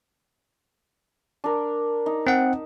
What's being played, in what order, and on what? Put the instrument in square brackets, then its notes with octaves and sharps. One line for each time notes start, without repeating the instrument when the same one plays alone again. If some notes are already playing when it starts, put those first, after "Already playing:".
[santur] D4 A#4
D#4
[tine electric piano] C4 F#5